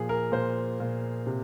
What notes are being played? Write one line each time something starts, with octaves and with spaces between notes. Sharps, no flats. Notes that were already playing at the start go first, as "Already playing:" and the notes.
Already playing: A#2 F3 G#4
A#4
A#2 C5
A#2
C3